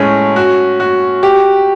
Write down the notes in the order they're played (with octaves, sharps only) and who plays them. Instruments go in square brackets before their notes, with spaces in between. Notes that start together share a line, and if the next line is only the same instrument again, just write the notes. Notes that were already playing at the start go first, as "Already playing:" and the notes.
Already playing: [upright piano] A2 G#3 C#4
F#4
F#4
G4